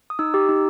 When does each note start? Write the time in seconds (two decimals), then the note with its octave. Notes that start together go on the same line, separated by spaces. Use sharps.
0.10 D#6
0.19 D#4 E6
0.34 G4
0.49 D#4